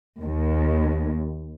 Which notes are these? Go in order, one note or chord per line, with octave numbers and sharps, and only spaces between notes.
D#2